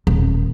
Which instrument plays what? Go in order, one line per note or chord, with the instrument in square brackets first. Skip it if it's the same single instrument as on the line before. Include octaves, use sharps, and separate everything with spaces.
[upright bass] D#1